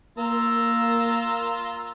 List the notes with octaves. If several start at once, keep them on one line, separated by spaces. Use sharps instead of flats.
A#3 F4 A#4 A#5 E6